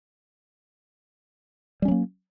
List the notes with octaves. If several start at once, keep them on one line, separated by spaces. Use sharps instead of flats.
F#3 G3 A#3 C#4